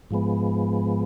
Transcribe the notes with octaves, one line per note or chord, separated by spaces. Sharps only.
G#2 F3 G#3 B3